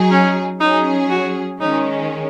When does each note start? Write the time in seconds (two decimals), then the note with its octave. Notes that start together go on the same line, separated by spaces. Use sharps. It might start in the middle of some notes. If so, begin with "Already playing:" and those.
Already playing: F#3 D#4 G#4
0.11 C#4
0.60 F#3 C#4 D#4 G#4
1.10 F#4
1.60 D#3 G#3 C#4 D#4